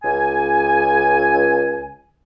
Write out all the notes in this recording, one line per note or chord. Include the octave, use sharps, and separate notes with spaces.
C#2 G#5